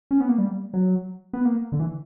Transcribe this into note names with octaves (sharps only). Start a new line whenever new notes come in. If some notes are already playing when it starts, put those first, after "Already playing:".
C#4
B3
A#3
G3
F#3
B3
A#3
D3
E3